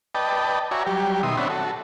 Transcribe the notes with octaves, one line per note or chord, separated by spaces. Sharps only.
B4 D5 D#5 G5 A5
F#4 C#5 D5 E5 G#5 A#5
F#3 G3 G4
B2 D#3 E5 C6 D#6
C4 D4 C#5 E5 F#5 B5
F#4 A4